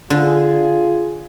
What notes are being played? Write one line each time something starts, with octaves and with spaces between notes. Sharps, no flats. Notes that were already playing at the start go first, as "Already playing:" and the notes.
D3 F4 G#4